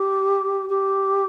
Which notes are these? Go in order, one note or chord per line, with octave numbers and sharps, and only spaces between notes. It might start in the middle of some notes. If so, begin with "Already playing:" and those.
Already playing: G4
G4